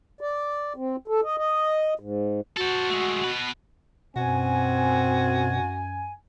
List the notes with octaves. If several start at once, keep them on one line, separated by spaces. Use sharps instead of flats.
D5
C4
A4
D#5
D#5
G#2
F#4 A4 C5
G#3 A3
B2 B4
F#2 B2 C4 F#4 G#5